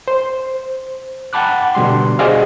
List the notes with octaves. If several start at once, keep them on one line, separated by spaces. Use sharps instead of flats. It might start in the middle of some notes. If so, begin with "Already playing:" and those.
C5
F#5 G5 A5 B5 D6 F#6
B2 D3 G3 C6
F#4 G#4 C5 D5 D#5 F5